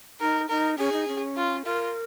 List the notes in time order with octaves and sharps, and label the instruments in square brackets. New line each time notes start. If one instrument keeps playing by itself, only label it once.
[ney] D#4 [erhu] A#4
[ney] D#4 [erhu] A#4
[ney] C#4 [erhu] G#4
[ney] D#4
C#4
[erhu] F4
[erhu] F4 [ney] A#4